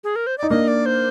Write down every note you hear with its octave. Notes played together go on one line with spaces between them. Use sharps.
G#4
A#4
C5
D#4 D5
A#3 D4 D#5
D5
C5